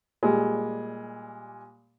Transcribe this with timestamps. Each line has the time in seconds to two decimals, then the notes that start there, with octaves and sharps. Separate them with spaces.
0.23 A#2 G3 G#3